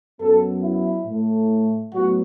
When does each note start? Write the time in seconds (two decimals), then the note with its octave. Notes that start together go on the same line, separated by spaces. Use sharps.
0.20 F#2 F#3 B3 A4
0.63 E4
1.06 A2 A3
1.93 A2 F#3 B3 F#4